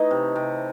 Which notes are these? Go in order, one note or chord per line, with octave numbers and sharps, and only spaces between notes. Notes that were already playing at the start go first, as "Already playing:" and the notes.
Already playing: E3 A3 D#4 D#5
C3
C3